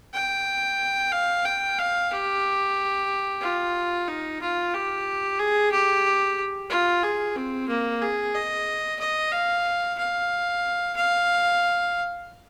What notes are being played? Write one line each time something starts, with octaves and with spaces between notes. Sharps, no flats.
G5
F5
G5
F5
G4
F4
D#4
F4
G4
G#4
G4
F4
G#4
C4
A#3
G#4
D#5
D#5
F5
F5
F5